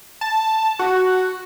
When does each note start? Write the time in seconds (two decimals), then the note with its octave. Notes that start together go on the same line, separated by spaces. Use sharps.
0.21 A5
0.79 F#4